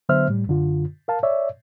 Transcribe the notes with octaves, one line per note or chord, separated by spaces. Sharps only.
D3 F#3 B3 C5 E5 F6
A2 G3
F#2 D3 F4
A#4 F5 A5
C#5 D5 E5